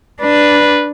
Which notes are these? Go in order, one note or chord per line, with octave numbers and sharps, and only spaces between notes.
D4 B4